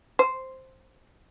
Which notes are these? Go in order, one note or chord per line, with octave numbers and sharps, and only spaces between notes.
C5